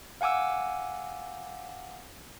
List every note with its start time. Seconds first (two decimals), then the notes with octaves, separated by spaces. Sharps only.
0.21 F5 F#5 G#5 D6 E6